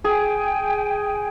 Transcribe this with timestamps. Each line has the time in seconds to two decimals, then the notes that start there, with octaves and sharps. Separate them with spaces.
0.04 G#4 G5 G#5